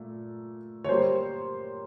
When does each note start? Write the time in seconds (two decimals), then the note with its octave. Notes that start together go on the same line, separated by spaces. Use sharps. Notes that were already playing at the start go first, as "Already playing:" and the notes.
Already playing: A#2 A3
0.84 C#5
0.89 G3 A#3 C5